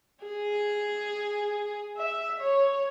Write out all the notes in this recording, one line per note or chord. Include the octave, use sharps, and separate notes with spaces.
G#4
E5
C#5